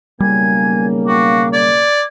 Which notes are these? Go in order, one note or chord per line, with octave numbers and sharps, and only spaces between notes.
B1 C#3 G3 A#3 G#5 G#6
F#4 F5 G5 D6
D5 G#6